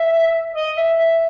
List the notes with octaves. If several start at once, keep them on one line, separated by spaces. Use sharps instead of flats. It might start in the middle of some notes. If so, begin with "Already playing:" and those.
Already playing: E5
D#5
E5
E5